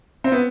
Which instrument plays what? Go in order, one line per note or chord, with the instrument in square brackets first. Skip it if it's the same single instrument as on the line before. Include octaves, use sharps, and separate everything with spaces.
[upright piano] C4
B3